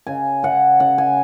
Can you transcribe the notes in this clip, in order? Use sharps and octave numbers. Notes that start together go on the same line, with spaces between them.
C#3 G#5
C#3 F#5
C#3 F#5
G#5